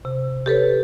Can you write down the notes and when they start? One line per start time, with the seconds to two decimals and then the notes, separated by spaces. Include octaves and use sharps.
0.05 C3
0.46 G4 A4 B4 C#5